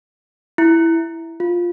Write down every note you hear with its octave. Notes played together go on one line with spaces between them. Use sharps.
E4
F4